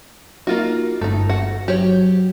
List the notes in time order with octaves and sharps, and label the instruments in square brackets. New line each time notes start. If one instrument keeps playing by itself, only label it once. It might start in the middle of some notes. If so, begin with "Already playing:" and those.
[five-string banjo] A#3 F4 F#4 [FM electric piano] D#4
[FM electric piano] G1 [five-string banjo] A3 D#4
[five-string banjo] F#4 F#5
[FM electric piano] F#3 [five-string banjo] G4 C#5